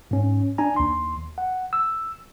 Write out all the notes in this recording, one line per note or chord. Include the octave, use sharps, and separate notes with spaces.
G#2 C#4
D4 G#5 A#5
D#2 C6
F#5
E6